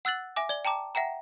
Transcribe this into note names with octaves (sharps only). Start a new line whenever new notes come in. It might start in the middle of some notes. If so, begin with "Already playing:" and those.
F#5 E6 F#6 A6 F#7
E5 G#5 D6
D5 G7
G5 A5 A#5 D6
E5 F#5 G5 A#5